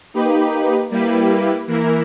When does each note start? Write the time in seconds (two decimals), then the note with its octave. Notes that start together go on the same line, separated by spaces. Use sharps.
0.14 A#3 D#4 G4 B4
0.90 G3 A#3 E4 G4 B4
1.67 E3 A#3 E4 A#4